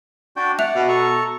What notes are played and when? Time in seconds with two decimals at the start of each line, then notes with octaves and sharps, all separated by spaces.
0.36 D4 F#4 G5
0.59 D5 E5 F#5 F#6 F7
0.75 B2
0.88 A4 A#5 C#6